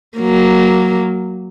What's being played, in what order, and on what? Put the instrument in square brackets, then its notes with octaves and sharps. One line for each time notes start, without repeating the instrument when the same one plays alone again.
[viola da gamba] F#3 A#3